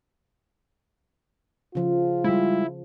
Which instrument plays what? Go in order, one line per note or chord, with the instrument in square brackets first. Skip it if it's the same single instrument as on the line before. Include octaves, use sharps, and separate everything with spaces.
[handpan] C#3 F3 [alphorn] F4
[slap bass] G3 G#3 [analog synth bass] E4